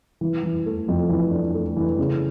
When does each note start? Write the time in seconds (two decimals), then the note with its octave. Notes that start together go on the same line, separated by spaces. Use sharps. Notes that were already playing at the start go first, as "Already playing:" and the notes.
0.21 E3
0.43 E3
0.66 A3
0.88 F2
1.09 E3
1.31 D4
1.54 A3
1.77 E3
1.99 C#3